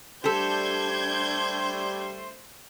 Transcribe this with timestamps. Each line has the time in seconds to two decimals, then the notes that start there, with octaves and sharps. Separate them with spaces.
0.24 G3 A3 D4 G4 A4 C5 G6 G#6